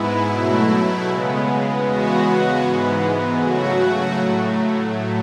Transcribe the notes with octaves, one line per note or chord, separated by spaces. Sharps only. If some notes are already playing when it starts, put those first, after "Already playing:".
Already playing: G#2 G#3 B3 E4
B2 F#3 A3 E4
C#3 G#3 B3
E2 C#3 G#3 B3 F#4
G#2 E3 G#3 B3
C#3 F#3 A3 F#4
A2 F#3 A3